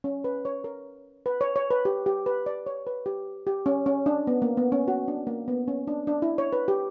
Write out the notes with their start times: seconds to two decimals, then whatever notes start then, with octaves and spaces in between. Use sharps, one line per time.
0.04 C#4
0.24 B4
0.45 C#5
0.64 A#4
1.26 B4
1.41 C#5
1.56 C#5
1.71 B4
1.85 G4
2.06 G4
2.26 B4
2.46 D5
2.66 C#5
2.87 B4
3.06 G4
3.47 G4
3.66 C#4
3.86 C#4
4.06 D4
4.27 B3
4.42 A#3
4.57 B3
4.72 C#4
4.88 F#4
5.08 D4
5.27 A#3
5.48 B3
5.68 C#4
5.87 D4
6.07 D4
6.22 E4
6.38 C#5
6.53 B4
6.68 G4